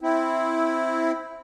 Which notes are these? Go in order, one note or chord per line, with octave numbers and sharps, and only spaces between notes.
C4 E4